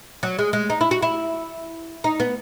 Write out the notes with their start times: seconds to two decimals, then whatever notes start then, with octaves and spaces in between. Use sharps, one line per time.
0.23 F#3
0.39 G#3
0.53 G#3
0.70 D#4
0.81 E4
0.91 F#4
1.02 E4
2.04 D#4
2.20 B3